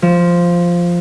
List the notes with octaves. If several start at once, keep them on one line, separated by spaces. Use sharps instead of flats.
F3